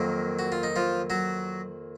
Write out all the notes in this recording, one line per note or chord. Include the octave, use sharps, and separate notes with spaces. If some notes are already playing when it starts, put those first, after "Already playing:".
Already playing: F2 D#3 F#3 A#3
F#4
F4
D#4
F3 F4
F#3 F#4